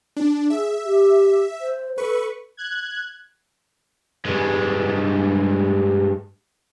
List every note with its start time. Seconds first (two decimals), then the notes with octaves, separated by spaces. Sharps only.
0.17 D4
0.50 G#4 E5
0.85 G4
1.61 C5
1.98 A4 B4 C#6
2.57 F#6 G#6
4.25 G2 G#3